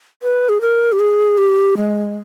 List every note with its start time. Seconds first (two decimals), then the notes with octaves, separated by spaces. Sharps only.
0.23 B4
0.49 G#4
0.61 A#4
0.92 G4
0.99 G#4
1.38 G4
1.77 G#3